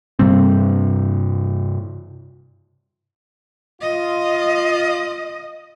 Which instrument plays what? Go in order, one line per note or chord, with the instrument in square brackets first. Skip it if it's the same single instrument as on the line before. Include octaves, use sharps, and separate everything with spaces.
[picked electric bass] G2 C3 G3 C4
[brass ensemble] F4 [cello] D#5